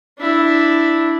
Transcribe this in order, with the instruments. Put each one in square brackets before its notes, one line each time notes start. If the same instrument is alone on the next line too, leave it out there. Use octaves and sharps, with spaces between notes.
[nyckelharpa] D4 E4